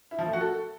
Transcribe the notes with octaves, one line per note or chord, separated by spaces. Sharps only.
E4
F3
A3
F#4
A4